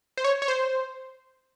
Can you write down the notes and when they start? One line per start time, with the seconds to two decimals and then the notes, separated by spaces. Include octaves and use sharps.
0.17 C5
0.24 C#5
0.42 C#5
0.48 C5